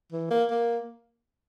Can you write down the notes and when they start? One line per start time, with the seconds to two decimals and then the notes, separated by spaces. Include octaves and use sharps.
0.12 E3
0.31 A#3
0.51 A#3